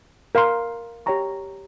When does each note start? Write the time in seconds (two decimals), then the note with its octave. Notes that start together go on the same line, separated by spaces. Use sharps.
0.35 A#4 F5 C6
1.06 G4 C#5 G5 A#5 C#6